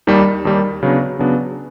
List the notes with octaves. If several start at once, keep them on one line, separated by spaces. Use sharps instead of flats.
D#2 D#3 G3
D#2 D#3 G3
C#3 F#3 B3 D4
C#3 F#3 B3 D4